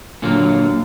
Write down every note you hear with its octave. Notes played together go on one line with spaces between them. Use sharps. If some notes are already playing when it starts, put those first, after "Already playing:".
A#2 D3 F#3 A#3